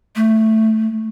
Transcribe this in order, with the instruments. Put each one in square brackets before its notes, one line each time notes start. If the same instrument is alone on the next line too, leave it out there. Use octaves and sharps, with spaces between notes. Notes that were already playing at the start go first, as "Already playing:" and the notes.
[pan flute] A3